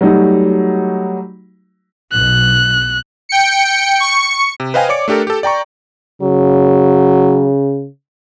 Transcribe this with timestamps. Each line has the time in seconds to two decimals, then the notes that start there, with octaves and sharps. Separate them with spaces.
0.01 F#3 G3 A3 D#4 F#4
2.13 B1 B2 F#6
3.29 G5 C#7
4.00 C#6 C#7
4.60 C3
4.74 B4 C5 D#5 F5 G5 G#5
4.89 C#5 D5 D6 C#7
5.08 A3 D4 G4 A4 A#4
5.27 G4 A4
5.43 D5 G5 A#5 C#6
6.22 C#3 F#3